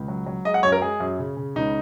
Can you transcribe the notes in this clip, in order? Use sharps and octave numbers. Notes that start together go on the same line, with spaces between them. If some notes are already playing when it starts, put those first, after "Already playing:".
Already playing: C#2
F#3
F#3
G#3 D#5
F#5
F#2 C#5
A#4
G#3 G#4
F#2
C#3
C#3
C#2 D#4